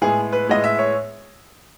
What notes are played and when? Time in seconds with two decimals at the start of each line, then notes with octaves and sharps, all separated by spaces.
0.01 A2 G#3 B3 G#4
0.32 B4
0.47 A2 G#3 B3 D#5
0.64 E5
0.79 C#5